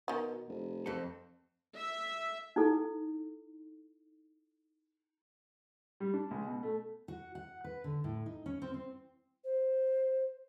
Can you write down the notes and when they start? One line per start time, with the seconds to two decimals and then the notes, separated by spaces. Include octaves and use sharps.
0.08 B2 D#3 G#5
0.48 F1
0.86 F2 C4 A4
1.76 E5
2.56 D#4 E4 A4
6.00 G3
6.14 D4
6.31 C#2
6.46 B2
6.63 A3
7.08 F#4
7.35 F#5
7.64 B4
7.84 D3
8.04 A2
8.26 D#4
8.46 C#4
8.62 C4
8.74 C4
9.44 C5